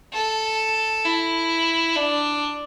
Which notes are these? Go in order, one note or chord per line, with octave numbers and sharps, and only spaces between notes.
A4
E4
D4